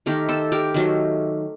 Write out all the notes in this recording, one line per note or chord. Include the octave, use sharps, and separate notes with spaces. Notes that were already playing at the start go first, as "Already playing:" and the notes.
D#3 A3 G4 A#4
A4 C5
G4 A#4
D#3 F#3 A3